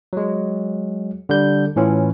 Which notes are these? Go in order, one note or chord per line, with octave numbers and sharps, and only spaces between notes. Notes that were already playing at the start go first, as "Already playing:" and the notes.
F#3 G#3
D3 G3 G6
A2 E3 C#4 F4